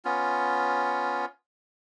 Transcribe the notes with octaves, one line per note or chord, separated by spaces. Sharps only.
B3 C#4 F4